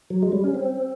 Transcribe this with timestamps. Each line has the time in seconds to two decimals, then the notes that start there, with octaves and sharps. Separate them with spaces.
0.10 F#3
0.22 G#3
0.32 G3
0.44 C#4
0.54 C4